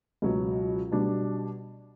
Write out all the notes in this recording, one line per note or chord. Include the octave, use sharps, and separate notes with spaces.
C#2 B2 F#3
B2 G3 D4